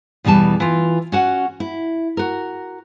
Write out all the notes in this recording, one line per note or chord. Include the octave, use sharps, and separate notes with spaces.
E2 B2 E3 G3 A5
E3 F4
C#4 F#4 F#5
E4
F#4 A#4